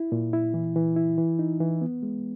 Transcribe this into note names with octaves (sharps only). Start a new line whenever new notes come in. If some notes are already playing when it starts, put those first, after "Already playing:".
Already playing: E4
A#2
E4
E3
E3
E4
E3
D#4
E3
B3
G#3